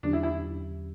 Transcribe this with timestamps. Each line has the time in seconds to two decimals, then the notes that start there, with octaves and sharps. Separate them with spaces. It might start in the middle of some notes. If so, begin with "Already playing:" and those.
0.03 E2 D3 F#3 C#4 D4 G4
0.13 E4
0.23 E4